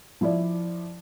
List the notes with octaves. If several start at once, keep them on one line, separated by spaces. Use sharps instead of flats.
F3 E4 D5